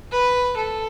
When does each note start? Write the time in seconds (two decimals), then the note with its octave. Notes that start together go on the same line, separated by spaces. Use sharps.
0.12 B4
0.56 A4